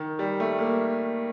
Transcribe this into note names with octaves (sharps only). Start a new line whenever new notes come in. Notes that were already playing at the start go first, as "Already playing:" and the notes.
Already playing: D#3
G3
A3
A#3